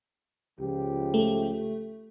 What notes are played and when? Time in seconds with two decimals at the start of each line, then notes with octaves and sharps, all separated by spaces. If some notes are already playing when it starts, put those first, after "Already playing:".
0.59 C#2 F3 G4
1.14 A3